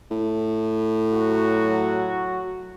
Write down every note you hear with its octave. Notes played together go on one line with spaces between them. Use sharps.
A2
F#3 F#4